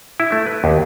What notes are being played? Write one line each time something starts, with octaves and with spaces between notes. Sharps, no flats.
E4
A3
B4
D#2